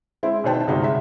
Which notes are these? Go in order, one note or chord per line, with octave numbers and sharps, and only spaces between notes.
G#3 C4 E4
B2 D#3 B3 C5 G5 A5
G1 C3 G#3 D#4 F#4
E5